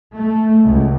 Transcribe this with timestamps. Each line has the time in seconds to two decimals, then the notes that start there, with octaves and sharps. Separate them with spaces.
0.15 A3
0.63 C#2